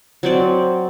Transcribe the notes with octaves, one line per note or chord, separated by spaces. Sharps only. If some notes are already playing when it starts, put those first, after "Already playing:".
F#3 C4 D5